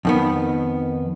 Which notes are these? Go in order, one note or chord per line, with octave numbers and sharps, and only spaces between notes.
F2 D#3 B3